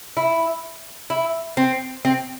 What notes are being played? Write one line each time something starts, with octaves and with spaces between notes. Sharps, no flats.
E4
E4
C4
C4